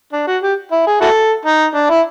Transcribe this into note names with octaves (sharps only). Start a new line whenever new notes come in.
D4
F#4
G4
E4
G#4
E4 F#4 A4
D#4
D4
E4